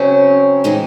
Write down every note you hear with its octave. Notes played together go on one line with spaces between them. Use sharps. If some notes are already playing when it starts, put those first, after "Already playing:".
Already playing: C#3 F#3 C4 C#4
E3 G#3 C4 D#4